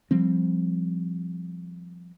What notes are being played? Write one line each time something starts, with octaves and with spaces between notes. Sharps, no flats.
F3 G3 C4